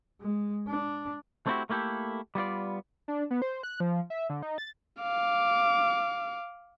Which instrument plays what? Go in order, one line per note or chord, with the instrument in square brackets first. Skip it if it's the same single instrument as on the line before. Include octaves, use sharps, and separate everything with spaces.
[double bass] G#3
D4
[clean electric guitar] A3 C4 D4 E4 F#4 G4
A3 A#3 E4 G4 A4
G3 B3 F4 D5
[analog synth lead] D4
B3
C5
F#6
F3
E5
D3
D#4
A6
[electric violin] F5 D6